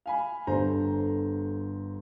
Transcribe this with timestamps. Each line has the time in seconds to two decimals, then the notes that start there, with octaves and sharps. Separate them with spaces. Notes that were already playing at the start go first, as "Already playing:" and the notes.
0.06 F5 G#5 B5
0.47 G1 D3 A4 C5 A#5